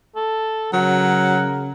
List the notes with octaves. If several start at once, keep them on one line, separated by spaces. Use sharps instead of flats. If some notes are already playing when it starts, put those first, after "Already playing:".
A4
C#3 F#3 A#4 F#5